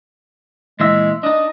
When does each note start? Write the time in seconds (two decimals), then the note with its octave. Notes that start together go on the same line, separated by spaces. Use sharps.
0.80 A#2 E3 G#3 E5
1.23 D4 D#4 D#5